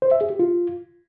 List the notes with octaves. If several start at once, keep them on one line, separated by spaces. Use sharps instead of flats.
C5
E5
G#4
G4
F4